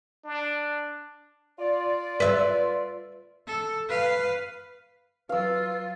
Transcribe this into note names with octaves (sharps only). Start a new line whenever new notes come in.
D4
F4 D5
B4 E5
A4
B4 F5
F#3 F4 B4 F5 E6